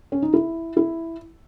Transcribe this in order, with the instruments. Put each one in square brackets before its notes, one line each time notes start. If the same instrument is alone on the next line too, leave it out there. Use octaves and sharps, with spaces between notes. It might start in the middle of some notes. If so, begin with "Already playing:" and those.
[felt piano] C#4
D#4
E4
E4